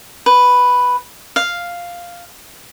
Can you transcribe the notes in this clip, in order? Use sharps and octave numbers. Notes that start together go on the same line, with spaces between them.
B4
F5